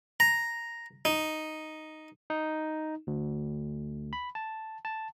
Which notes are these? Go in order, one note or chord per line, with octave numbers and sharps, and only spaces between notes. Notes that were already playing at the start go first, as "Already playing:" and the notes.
A#5
D#4
D#4
D2
B5
A5
A5